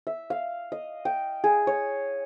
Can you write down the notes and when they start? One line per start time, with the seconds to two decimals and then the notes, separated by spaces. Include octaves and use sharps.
0.07 E5
0.30 F5
0.72 D#5
1.05 G5
1.44 G#4
1.67 C#5